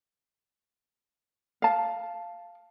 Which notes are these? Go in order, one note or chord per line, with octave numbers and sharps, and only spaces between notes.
F5 A5